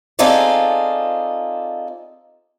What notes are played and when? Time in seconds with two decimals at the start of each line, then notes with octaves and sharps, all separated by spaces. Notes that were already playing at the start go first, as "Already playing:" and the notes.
0.19 C4 D#4 F4 G#4 A4 D5